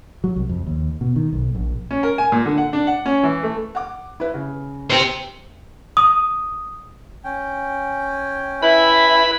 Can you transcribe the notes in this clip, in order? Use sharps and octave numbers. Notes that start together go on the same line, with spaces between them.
F#3
C2
F2
D#2
B2
D#3
B1
A#1
C#4
A#4
G#5
A#2
D3
F#5
D4
F#5
C#4
E3
A3
F#5 D6
E4 B4
C#3
G4 C5 C#7
D#6
C#4 G5
E4 B4 E5 B5